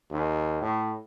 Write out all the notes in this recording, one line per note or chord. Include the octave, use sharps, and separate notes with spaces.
D#2
A2